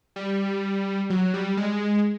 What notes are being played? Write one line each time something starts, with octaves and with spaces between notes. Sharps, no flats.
G3
F#3
G3
G#3